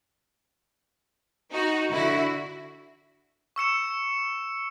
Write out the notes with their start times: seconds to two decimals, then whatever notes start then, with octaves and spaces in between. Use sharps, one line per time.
1.52 D#4 F#4
1.92 D3 E4 F#4
3.56 C#6 E6 C#7 E7